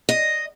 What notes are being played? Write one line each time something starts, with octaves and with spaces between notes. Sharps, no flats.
D#5